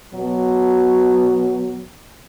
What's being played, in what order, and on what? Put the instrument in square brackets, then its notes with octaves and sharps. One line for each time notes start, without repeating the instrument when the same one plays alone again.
[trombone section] B2 F#3